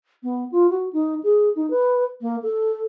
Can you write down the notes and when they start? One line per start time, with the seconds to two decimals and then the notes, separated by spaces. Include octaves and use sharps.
0.23 B3
0.52 F4
0.70 F#4
0.93 D#4
1.23 G#4
1.56 D#4
1.70 B4
2.21 A#3
2.43 A4